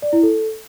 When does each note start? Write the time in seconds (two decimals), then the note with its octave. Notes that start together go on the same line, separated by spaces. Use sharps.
0.02 D5
0.13 E4
0.23 A4